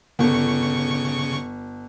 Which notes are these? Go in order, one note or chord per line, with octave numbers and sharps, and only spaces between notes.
G1 C#3 C#6